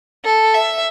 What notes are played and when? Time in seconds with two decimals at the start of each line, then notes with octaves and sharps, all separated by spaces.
0.24 A4
0.54 E5